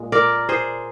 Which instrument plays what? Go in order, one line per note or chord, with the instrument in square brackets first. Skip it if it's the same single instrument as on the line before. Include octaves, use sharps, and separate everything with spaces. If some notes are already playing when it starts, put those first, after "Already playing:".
Already playing: [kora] A#2 G#3
A#4 D5
G#4 C5